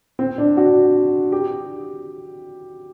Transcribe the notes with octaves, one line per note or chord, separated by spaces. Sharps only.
C4
D4
F#4
G4